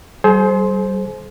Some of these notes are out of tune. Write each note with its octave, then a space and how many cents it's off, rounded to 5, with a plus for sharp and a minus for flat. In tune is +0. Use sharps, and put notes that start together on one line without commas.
G3 -30 G#4 +45 C5 +0